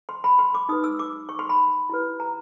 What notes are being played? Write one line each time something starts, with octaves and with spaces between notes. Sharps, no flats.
C6
B5
C6
D6
D#4 G4 B4 D#6
E6
D6
C#6
C6
B5
E4 G4 B4
A#5